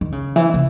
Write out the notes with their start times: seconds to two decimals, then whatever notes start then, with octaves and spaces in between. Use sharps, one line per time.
0.01 D#3
0.12 C#3
0.36 E3
0.54 C#3